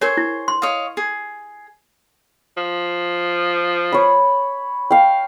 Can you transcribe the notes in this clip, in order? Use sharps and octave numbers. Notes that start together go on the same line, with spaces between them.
G#4 A#4 C5 C#5 C#6
E4
C6
C#5 D#5 F5
G#4
F3
C#5 B5
F5 G5